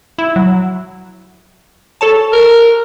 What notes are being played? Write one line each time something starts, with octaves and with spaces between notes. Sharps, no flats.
E4
F#3
A4 C#5 A5
A#4